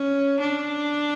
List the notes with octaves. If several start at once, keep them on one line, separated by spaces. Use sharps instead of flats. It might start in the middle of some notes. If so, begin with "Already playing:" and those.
Already playing: C#4
D4